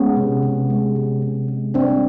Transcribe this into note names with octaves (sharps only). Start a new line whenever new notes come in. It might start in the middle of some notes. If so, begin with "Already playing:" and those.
Already playing: G#3 B3 C#4
C3
C3
G#3
C3
C3
G#3
G3 C4 D4